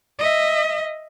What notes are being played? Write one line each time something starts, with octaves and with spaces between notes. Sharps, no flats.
D#5 E5